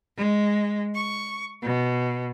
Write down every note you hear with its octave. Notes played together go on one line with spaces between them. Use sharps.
G#3
C#6
B2